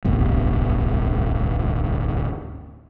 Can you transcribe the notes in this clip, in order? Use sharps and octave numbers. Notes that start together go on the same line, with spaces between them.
D1 G1 C2